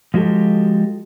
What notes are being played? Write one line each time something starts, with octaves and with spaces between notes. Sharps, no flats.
F3 G#3 F#4 G4 A4